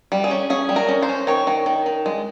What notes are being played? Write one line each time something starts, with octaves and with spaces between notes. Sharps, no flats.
G3
G#4
C#4
C#4 G#4
G3
A#4
C#4
C5
C#4
D#3 C#5
D#3
D#3
D#3
G#3